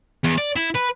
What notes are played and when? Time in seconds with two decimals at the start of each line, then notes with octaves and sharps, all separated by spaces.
0.24 E2
0.38 D5
0.56 E4
0.75 B4